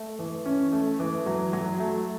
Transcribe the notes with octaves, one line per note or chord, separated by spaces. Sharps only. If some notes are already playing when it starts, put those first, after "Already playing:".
Already playing: A3
E3
C#4
A3
E3
F#3
F#3
A3